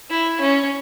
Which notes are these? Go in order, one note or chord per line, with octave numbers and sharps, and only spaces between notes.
E4
C#4